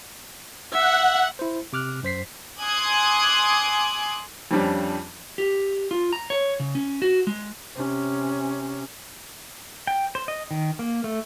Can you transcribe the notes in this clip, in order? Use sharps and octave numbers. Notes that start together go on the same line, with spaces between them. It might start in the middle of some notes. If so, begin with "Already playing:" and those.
E5 F#5
E4 C5
C3 D6 F6 F#6
F#2 C5 B6 C7
G#5 C6 D6 D#6 F#6 G#6
F2 F3 G3 C#4 D4
G4
F4
A#5
C#5
C#3
C#4
F#4
G#3
C3 C#4
G5
C5
D#5
D#3
A#3
A3